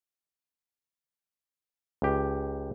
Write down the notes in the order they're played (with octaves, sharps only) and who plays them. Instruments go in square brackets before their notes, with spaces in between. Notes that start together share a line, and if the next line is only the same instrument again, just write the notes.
[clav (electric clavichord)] C#2 G4